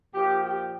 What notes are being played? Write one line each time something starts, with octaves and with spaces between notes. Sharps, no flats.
A#2 F3 G4
G4